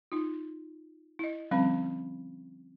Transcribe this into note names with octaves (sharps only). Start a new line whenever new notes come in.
D#4 F4
E4 D#5
D3 F3 G3 C4 C#4 B5